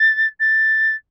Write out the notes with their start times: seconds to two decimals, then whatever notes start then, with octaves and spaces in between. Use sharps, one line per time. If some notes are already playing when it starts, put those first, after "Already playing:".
Already playing: A6
0.40 A6